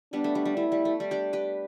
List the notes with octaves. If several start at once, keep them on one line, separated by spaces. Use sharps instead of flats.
G3 B3 D4
A3
G3
G3
A3 E4
G3
A3
G3
D4 G4
G4 B4